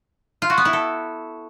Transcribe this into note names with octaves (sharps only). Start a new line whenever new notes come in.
F4
F#4
B3
E4
A4